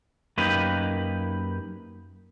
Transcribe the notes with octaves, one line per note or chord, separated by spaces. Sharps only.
F#2 A#3 D#4 G4 B4